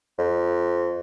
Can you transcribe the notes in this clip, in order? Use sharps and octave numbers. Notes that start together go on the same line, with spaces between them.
F2